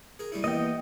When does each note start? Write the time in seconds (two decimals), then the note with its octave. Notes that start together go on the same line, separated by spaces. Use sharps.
0.19 G#4 A#4
0.32 G3 C#4 E4
0.44 E3 A#3 B3 D#5 G5